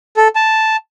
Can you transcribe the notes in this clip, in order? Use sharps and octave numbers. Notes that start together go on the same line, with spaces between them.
A4
A5